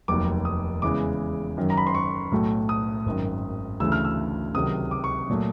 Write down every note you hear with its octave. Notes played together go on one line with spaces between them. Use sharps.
F1 D#2 D#3 F#3 D6
D#6
E2 C#3 E3 G#3 D6
F#2 D#3 F#3
A#5
B5
C6
C#6
B1 A2 F#3 A3
D#6
G#1 F#2 D#3
D2 C#3 E3 A3 E6
F6
E6
C#2 C3 D#3 F#3 D#6
D6
C#6
A#2 F#3 A3